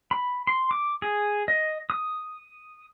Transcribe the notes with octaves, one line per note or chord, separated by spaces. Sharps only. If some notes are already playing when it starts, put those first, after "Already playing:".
B5
C6
D6
G#4
D#5
D#6